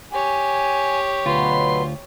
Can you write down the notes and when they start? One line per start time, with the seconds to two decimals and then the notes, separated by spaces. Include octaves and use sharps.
0.13 G4 C#5 G#5
1.26 D2 B2 F#3 F4 B4 C6